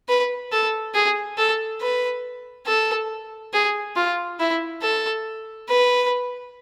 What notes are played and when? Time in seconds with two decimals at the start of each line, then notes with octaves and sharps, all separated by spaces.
0.09 B4
0.52 A4
0.94 G#4
1.37 A4
1.81 B4
2.66 A4
3.53 G#4
3.96 F4
4.39 E4
4.82 A4
5.69 B4